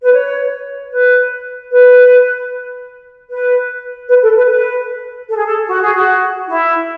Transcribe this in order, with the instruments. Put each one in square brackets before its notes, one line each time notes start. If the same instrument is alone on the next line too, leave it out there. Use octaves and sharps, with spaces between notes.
[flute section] B4
C#5
B4
B4
B4
B4
A4
B4
B4
A4
G#4
A4
F#4
G#4
F#4
E4